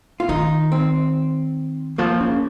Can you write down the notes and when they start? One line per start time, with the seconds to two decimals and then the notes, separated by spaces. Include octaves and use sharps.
0.20 F4
0.29 D#3 D#4
0.72 C4
1.98 F3 A#3
2.20 C#3